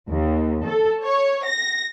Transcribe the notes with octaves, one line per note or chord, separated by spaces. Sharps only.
D#2
A4
C#5
A#6